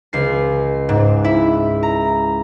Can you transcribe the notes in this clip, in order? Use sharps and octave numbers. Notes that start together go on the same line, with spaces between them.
C#2 C7
G#2
E4
A#5